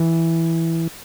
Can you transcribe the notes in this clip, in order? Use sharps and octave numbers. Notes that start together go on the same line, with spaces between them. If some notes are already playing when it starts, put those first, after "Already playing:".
Already playing: E3